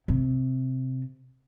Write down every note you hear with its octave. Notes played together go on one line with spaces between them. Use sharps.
C3